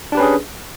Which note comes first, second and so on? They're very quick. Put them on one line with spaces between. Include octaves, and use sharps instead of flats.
D4 G4 B4 C#4 G#4